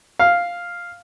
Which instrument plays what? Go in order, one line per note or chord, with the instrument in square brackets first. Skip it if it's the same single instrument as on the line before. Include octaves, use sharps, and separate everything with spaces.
[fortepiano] F5